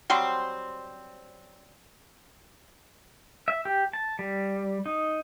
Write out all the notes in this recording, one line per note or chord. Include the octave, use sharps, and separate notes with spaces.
F#3 G3 C4 C5
E5
G4
A5
G3
D#4